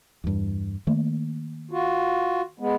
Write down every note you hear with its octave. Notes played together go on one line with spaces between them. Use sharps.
E2 G2
D#3 A3 A#3
F4 F#4
G#3 B3